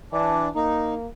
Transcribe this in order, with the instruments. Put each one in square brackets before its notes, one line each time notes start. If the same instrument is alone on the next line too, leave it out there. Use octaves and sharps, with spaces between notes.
[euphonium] E3 [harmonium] D4
[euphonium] A#3 [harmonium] D#4